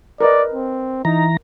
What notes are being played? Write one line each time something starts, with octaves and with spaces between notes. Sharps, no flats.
A#4 B4 D5 D#5
C4
E3 D#4 A#5